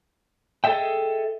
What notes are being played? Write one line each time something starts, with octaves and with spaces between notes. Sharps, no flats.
G#4 A4 C5 D#5 E5 G5